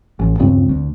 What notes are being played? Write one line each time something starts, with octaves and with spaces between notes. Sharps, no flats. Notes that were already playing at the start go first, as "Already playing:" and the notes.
A1
D#1 C#2 G2 C4
D2